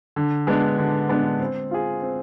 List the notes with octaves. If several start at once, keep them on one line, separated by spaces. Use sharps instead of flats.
D3
G#3 B3 D4
D3
G#3 B3 D4
C4
F4 G#4
C4